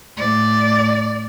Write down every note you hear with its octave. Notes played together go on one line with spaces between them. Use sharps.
A2 D5